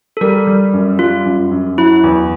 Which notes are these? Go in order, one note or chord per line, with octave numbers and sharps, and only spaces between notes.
A4
G3 A#4
G3
F#2
G3 F4
F#2
F#2
F#3 E4
E2